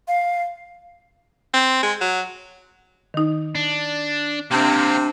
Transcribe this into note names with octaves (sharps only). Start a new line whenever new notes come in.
F5
C4
G#3
F#3
D#3 D#4
D4
C3 A#3 C4 D4